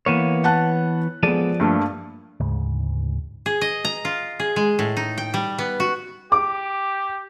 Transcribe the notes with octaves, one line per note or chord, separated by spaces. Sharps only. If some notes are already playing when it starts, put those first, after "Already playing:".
E3 A#3 B3 C#5
F#5 A5 F#6
F3 G#3 B3 A4 D5
G2 A3 A#3
D2 G#2 C#3 G#3
G#4
D#5
A#5
F4
G#4
G#3
A2
D#4
G5
G3
B3
F#4
G4 D6